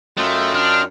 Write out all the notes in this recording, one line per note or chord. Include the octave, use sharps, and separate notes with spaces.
F#2 A3 F4 D#5 G5
D4 F6